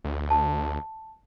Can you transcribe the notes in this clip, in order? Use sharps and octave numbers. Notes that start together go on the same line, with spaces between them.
D2
A5